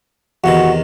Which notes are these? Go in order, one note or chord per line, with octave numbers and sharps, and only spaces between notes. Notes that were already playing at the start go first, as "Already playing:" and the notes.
E2 C3 D#3 F#4